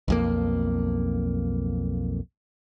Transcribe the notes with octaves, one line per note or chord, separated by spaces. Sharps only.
B1 F2 A#3